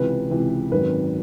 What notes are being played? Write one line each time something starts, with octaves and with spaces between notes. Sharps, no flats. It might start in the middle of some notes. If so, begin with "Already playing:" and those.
Already playing: C#2 C3 E3 B4
C#2 C3 E3
G#1 F#2 D#3 B4